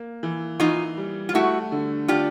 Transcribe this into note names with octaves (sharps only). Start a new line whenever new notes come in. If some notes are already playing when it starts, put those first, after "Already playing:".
Already playing: A#3
E3
E3 D#4 F4
G3
F4
A3 E4 F#4
D3
D4 F4 G4